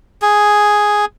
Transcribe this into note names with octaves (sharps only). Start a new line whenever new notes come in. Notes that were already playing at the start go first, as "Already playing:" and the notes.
G#4